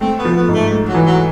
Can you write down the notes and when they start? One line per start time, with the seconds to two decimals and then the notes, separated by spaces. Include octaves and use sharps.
0.01 A3 C4
0.19 B3
0.25 F3
0.36 B3
0.48 G#2
0.54 A3
0.72 A3
0.88 F#3
0.95 E3
1.06 F#3